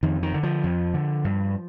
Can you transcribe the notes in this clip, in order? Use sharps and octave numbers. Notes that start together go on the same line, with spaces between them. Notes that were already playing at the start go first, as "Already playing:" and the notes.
F2 D#3
D#3
D3
F3
F2
D3
G2